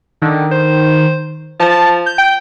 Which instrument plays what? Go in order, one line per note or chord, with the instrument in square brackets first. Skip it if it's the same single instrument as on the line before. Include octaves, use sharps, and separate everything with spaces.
[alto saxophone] D3 [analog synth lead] D#3
[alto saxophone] C5
[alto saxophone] F3 [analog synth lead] A5
[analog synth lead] G6
[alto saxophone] G5